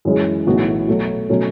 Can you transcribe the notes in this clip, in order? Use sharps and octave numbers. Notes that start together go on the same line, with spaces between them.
F#2 E3 G#3 C#4 G#4
B1 A2 E3 B3 F#4
B2 F#3 A3
B2 F#3 A3 C#4